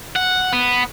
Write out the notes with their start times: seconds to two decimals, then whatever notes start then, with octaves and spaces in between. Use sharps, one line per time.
0.16 F#5
0.53 B3